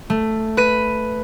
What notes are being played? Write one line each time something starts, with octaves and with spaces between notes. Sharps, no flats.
A3
B4 B6 D#7